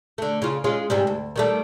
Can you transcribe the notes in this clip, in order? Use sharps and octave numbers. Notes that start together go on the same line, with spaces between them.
D3 A3
C#3 F4
G#3 C#4 F4
G#2 C3 G3
D2
D#3 G3 A3